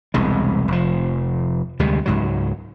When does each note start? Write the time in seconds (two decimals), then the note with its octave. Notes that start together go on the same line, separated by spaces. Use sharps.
0.14 E1 C2 G#3
0.68 F1 F3
1.79 D2 C3 G3 G#3
2.06 C#2 G#2 F#3